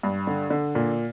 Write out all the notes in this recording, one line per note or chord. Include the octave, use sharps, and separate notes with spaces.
G2
D3
D3
A#2